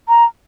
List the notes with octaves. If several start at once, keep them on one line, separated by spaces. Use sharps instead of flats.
A#5